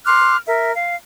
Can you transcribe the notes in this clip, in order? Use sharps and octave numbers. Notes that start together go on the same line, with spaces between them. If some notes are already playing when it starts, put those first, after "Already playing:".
C6 D6 F6 F#6
A#4 E5
F5